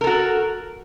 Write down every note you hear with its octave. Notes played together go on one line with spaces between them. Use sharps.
F#4 A4 A#4